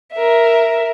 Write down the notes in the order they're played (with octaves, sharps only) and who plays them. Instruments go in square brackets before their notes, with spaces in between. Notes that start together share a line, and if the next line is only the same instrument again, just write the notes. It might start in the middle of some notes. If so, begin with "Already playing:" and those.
[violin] A#4 E5